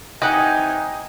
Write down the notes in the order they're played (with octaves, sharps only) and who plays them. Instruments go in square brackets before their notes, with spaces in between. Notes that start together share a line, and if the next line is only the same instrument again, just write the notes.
[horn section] C3 E3 D#4 [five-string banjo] G4 [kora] D#5 F#5 [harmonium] G#5